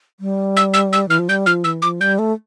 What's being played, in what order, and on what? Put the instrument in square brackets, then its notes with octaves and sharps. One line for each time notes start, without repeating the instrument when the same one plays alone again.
[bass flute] G3
[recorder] E6
E6
E6
[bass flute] E3 [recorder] F6
[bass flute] F3
[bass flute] G3 [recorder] G6
[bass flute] F3 [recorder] F6
[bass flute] E3 [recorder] E6
[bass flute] F3 [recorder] D6
[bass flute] G3 [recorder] G6
[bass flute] A3